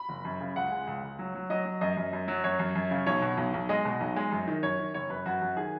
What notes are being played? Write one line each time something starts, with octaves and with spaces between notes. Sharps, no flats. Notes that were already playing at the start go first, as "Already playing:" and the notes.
Already playing: B5
F#1
F#2
C#3
C#2 F#5
G#3
C#2
C#2
F#3
F#3
F#3 D#5
F#3
F#2 D#5
F#2
F#2
F#3
F#2 C#5
F#2
F#2
C#3
B1 C#5
B2
B1
B1
G#3 D#5
B2
B1
G#3
F#2
D#3
F#2 C#5
D#3
F#1 C#5
F#2 B4
F#2 F#4
F#2
D#3 G#4